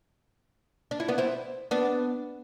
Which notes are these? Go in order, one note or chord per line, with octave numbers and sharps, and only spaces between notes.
D4
E4
B3 D4
C4 E4
B3 D4